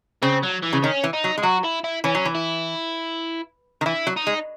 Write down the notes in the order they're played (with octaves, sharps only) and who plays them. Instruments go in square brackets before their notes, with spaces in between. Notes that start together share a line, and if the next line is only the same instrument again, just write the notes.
[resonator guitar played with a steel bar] C#3 [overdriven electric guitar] C4
[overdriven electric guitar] F#3
E3
[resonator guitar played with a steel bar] C#3
[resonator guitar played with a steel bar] D#3 [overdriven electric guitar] C#4
[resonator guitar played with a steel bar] E3
[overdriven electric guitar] D#4
[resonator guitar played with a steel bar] F#3
G#3
[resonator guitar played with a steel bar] F#3 [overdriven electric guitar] F#4
[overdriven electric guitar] E4
E4
[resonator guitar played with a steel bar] E3 [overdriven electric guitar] C#4
[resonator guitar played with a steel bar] F#3
E3
[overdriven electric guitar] E4
[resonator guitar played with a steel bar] D#3
[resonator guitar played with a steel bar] E3 [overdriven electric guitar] E4
[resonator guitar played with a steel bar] F#3
[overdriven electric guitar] D#4
[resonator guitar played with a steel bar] G#3